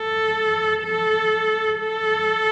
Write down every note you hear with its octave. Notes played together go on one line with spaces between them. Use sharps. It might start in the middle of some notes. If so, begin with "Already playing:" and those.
Already playing: A4
A4
A4